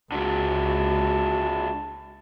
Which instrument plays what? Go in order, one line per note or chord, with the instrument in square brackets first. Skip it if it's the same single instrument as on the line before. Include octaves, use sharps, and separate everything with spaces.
[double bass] C#2 [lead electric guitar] D3 G#3 [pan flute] F#4 [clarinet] A5